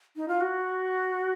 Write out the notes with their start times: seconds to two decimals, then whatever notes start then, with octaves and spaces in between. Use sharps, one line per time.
0.16 D#4
0.28 F4
0.41 F#4